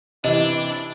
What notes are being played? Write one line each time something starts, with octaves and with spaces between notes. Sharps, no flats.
C3 E3 D4 E4 D#5